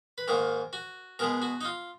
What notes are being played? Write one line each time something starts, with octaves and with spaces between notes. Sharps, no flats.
B4
G#2 D#3 A#3 A#4
F#4
B2 G#3 B3 A#4
F#4
D#4
F4